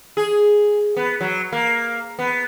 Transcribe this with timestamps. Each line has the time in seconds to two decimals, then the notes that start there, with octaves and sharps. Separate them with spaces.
0.17 G#4
0.97 B3
1.21 F#3
1.52 A#3
2.19 B3